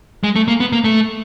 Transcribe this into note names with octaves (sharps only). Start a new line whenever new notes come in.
G#3
A3
A#3
B3
A#3
A3